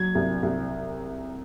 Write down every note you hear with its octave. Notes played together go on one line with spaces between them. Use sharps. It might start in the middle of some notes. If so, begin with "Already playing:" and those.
Already playing: F#3 G#6
C2
C2